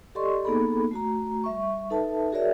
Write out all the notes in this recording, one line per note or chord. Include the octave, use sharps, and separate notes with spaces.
G4 A4 D5 D#5 C6 C#6
A#3 B3 D#4 G#4 A4 B5
A3 F#4 A#5
G3 E5 C#6
D#4 A4 B4 E5 A5
F#4 G#4 A#4 C#5 D5 E5